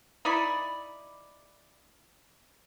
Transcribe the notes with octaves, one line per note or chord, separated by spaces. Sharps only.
D#4 E4 D5 B5